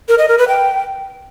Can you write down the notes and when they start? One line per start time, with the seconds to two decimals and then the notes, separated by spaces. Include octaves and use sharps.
0.09 A#4
0.18 D#5
0.28 A#4
0.38 B4
0.48 G5